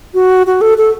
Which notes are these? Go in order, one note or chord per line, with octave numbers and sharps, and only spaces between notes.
F#4
F#4
A4
A4